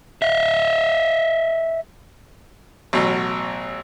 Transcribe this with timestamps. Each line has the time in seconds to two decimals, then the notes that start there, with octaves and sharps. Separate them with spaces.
0.22 D#5 E5
2.93 A1 B2 F#3